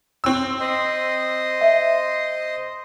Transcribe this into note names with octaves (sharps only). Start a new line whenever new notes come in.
C4 E6
C5 D#5
E5